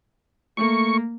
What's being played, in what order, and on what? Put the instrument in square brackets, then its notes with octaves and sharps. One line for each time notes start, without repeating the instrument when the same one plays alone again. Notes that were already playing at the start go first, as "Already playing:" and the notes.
[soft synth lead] A3 [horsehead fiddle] A#3 [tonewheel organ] C#6